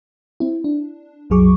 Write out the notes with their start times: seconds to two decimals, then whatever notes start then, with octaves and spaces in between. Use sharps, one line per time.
0.40 C4 E4
0.64 D4
1.30 C2 F#2 F#3 G#4 C#6 D6